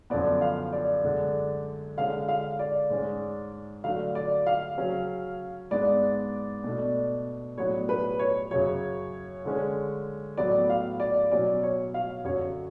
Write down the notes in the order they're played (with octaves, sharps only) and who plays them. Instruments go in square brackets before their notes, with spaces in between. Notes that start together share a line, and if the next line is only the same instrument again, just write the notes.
[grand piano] F#2 D3 F3 B3 [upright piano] D5
[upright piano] F5
D5
[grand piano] F#2 D3 G#3 D4
[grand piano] D3 G#3 C#4 [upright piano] F5
[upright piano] F5
D5
[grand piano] G#2 G#3 C#4
[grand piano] D3 F#3 A3 D4 [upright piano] F5
[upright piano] D5
F5
[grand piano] C#3 F#3 C#4
[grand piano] G#2 G#3 B3 D4 [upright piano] D5
[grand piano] B2 A3 D4
[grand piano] A2 F#3 B3 D4 [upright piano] C#5
[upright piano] B4
C#5
[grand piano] F#2 C#3 F#3 [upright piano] C#5
[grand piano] D3 G#3 C#4
[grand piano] A2 F#3 B3 [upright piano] D5
[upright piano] F5
D5
[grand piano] B2 F#3 C#4 [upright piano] D5
[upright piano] C#5
F5
[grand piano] F#2 D3 F#3 [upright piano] C#5